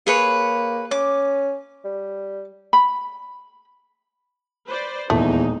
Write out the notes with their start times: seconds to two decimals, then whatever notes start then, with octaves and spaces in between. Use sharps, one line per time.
0.07 A#3 G#4 B4 C#5
0.91 C#4 D6
1.84 G3
2.73 B5
4.66 B4 C5 D5
5.10 D#1 E2 G#3 A3 D#4